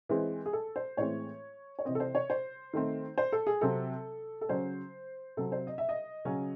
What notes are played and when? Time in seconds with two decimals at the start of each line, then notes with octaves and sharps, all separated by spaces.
0.09 E3 G#3 C4
0.46 G#4
0.53 A4
0.76 C5
0.97 A2 E3 G#3 C4 C#5
1.79 C#5
1.85 C3 E3 C4 D#5
1.95 A4
2.00 C5
2.15 C#5
2.30 C5
2.74 D#3 A3 C4
3.18 C5
3.32 A4
3.47 G#4
3.61 C3 F#3 C4 A4
4.41 A4
4.49 C#3 F#3 C#4 C5
5.37 C3 F#3 C4 A4
5.52 C5
5.67 D#5
5.78 E5
5.89 D#5
6.25 C#3 F#3 C#4